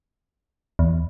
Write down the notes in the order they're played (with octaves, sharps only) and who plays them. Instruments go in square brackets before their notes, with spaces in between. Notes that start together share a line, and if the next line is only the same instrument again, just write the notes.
[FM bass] E2